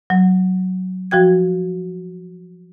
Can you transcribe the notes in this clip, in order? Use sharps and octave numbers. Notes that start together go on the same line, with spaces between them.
F#3
F3 F#4 G5 G#6